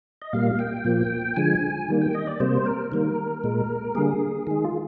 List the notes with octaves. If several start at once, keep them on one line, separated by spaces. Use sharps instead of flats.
D#5
A#2 G3 A#3 F5
G5
A#2 F3 A#3
D3 F3 G#3 G#5
D#3 G3 A#3
G5
D#5
D5
C3 G3 A#3 C5
A#4
D#3 G3 A#3
A#2 G#3
D3 G3 A#3 G#4
D#3 G#3 G#4
F4